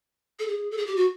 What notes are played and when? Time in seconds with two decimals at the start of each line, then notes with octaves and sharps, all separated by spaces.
0.39 A4
0.48 G#4
0.71 A4
0.77 G#4
0.86 G4
0.96 F#4